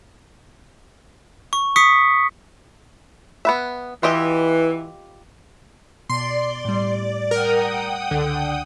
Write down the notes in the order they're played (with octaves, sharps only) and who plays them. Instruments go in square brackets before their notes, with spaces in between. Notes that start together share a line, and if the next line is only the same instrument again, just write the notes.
[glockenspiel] C#6
C#6 D#6 B6 C#7
[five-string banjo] B3 B4 E5
[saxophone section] E3 [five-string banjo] F4 G4 D#5
[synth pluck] B2 [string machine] D5 [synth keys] C6
[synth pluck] A2 G3
[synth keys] A#4 [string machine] F#5 G5 D#6
[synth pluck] C#2 [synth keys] D3